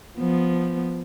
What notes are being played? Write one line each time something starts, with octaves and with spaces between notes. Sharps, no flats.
F3 B3